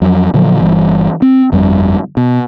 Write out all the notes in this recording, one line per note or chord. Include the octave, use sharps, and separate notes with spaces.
F2 F#3
A#2 D3 F3 F#3
G1 E3 G3
C4
G1 F2 G3
B2